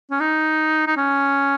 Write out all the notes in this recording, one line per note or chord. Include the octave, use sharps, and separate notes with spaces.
C#4
D#4
D#4
C#4